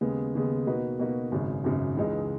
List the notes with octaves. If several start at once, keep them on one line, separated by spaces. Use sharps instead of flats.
D#2 C#3 G#3 B3
D#2 C#3 G#3 B3
B2 A#3 D#4 F#4 B4
B2 A#3 D#4 F#4 B4
G#1 F#2 C#3
G#1 F#2 C#3
C#2 C#3 E3 G#3 D#4